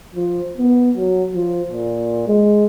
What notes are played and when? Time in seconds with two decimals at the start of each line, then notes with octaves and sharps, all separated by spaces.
0.15 F3
0.57 B3
0.97 F#3
1.35 F3
1.71 A#2
2.27 G#3